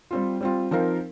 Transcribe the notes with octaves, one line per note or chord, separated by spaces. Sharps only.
G3 C4 F4
G3 C4 F4
F3 C4 D#4 A#4 F5